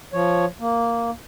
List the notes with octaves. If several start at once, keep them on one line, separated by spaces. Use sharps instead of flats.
F3 C#5
A#3